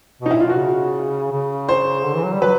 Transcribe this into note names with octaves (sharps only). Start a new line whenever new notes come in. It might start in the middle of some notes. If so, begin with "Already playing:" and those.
B2 D#4
A#2 E4
F4
B2 F#4
C#3
C#3
C5
D3
E3
F#3
G3
F#3 B4